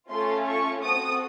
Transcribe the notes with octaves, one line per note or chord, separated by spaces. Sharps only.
A3 C#4 F4 A4 C6
C#6
C4 F#4 A4 D#6